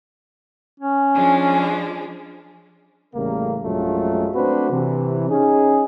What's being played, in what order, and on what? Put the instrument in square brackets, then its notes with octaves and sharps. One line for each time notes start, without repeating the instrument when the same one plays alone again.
[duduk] C#4
[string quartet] F3 G#3 D4
[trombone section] A1 C#3 G3 A3 A#3 A#4
A#1 F#2 F#3 G#3 A3 F4
A3 C4 D4 F#4 B4 C5
C3 E3
C#4 D#4 G#4